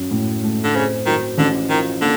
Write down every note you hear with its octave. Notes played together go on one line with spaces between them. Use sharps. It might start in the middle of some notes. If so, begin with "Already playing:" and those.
Already playing: F#2 F#3
A2
A3
D3
C#3 C4
D#3 F#3
A1 D3
D#3 F3
D3 A#3